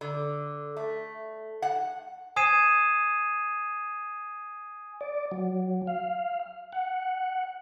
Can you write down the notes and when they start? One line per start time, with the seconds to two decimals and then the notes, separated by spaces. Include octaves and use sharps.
0.01 D3
0.76 A3
1.62 F#5
2.36 G#5 D#6 G#6 C7 D#7 E7
5.01 D5
5.31 F#3
5.87 F5
6.73 F#5